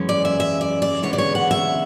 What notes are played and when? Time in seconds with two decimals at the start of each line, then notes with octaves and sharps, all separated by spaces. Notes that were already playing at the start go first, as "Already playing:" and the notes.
Already playing: F#2 E3 G#3 C#4
0.09 D5
0.25 E5
0.40 E5
0.61 D5
0.82 D5
1.02 D2 C#3 E3 G#3 B3 C#5
1.13 D5
1.18 C#5
1.35 F#5
1.51 E5